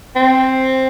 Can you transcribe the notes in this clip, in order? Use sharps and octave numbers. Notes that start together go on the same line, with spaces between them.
C4